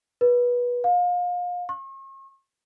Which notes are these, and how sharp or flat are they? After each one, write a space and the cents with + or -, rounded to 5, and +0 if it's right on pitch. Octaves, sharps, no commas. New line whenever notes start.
B4 -20
F5 +30
C#6 -45